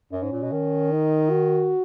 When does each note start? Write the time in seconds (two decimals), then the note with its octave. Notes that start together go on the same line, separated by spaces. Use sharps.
0.12 F#2 C#4
0.23 G#2
0.32 A#2
0.43 B2
0.51 D#3
0.92 D#4
1.31 F#4